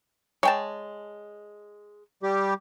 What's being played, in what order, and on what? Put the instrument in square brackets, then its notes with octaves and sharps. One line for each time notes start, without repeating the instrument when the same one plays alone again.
[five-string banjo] G#3 [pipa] C#5 G5 A5
[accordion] G3 G4